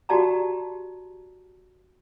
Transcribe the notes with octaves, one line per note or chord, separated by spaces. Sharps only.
F#4 G4 D5 A5 A#5